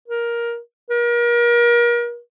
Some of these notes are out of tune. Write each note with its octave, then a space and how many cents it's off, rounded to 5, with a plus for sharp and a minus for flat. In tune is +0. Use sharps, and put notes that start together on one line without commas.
A#4 +10
A#4 +35